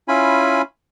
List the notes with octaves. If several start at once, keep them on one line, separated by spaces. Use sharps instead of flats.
C#4 E4 F4 G#5 B5